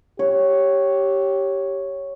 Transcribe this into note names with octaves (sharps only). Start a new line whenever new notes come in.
G4 C#5